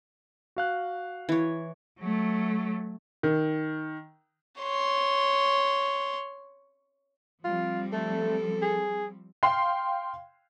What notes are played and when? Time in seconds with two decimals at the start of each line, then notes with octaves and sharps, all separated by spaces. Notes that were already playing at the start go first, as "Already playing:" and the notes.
0.56 F#4 F5 F#6
1.29 E3 C#5
1.99 F#3 A3
3.23 D#3
4.60 C#5 C6
7.45 F3 G3 C4 F4
7.93 A3 A4
8.62 G#4
9.43 F5 G5 C6 C7